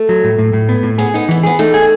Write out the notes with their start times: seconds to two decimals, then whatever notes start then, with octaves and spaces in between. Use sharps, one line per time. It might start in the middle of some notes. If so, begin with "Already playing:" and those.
Already playing: A3
0.09 F#3
0.24 A2
0.39 A2
0.53 A2
0.69 B3
0.83 A2
0.98 B3 G#4
1.14 B3 D#4
1.29 E3 B3
1.43 B3 G#4
1.59 A3 D#4
1.74 G#4